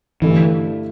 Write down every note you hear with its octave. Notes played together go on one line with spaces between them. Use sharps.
G2 D3 E3 A3 E4